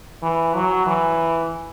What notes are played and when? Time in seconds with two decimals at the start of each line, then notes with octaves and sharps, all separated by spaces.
0.23 E3
0.54 F#3
0.87 E3